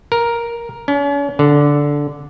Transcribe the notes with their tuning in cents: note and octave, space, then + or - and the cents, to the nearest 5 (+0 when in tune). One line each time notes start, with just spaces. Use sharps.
A#4 +10
C#4 +40
D3 -10